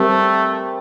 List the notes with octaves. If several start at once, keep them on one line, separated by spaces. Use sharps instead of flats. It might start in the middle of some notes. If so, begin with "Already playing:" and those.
Already playing: G3 A3 C4 G4 A#4